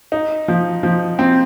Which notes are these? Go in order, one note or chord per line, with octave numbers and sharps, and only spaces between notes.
D#4
F3
F3
C4